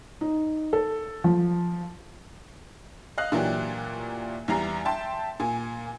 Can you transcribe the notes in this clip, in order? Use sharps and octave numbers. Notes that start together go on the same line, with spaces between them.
D#4
A4
F3
D#5 F5 F#6
A#2 E3 F#3 D4 G4
E2 E3 G3 A#5 C7
E5 G5 A5 C6
A#2 G#5